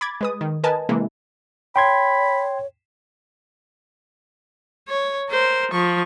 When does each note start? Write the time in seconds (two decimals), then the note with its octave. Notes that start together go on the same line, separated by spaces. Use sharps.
0.01 B5 D6 G#6 A6
0.21 G#3 B4 D#6
0.41 D#3
0.64 A#4 B4 D#5 G#5 A5
0.89 C3 E3 G#3 A#3
1.76 C#5 G5 B5 C6 G#6
4.89 C#5
5.30 A#4 C5
5.72 F3 C#6